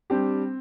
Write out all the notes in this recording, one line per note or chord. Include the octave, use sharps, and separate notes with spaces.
G3 C4 D4 G4